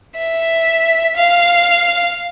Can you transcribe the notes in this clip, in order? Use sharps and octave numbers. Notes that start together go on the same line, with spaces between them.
E5
F5